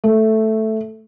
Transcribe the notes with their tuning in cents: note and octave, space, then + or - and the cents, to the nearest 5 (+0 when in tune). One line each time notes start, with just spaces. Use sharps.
A3 +0